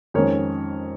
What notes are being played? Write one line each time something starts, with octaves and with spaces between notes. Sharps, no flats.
F2 D#3 G#3 C#4 A#4 C#5